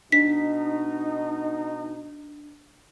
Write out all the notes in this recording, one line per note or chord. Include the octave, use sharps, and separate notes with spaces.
B2 D4 D#4 B6